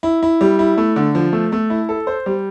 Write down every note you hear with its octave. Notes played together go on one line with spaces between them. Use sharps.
E4
E4
G3
E4
A3
D3
F3
A3
A3
E4
A4
C5
G3